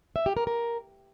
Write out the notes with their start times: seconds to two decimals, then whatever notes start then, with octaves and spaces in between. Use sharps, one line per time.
0.16 E5
0.26 G4
0.37 A#4
0.47 A#4